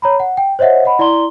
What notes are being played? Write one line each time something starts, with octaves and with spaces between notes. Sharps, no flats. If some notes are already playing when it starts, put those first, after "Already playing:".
C#5 A#5 B5
F#5
G5
C5 C#5 D#5 E5 F#5
D#5 F#5 B5
E4 D5 A#5 C6 G7